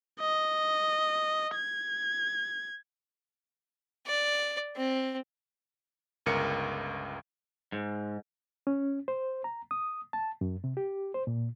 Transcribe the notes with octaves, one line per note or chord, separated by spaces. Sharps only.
D#5
G#6
D5
C4
G1 C#2 A#4 C#7
G#2
C#4
C5
A#5
D#6
A5
F#2
C3
G4
C5
A#2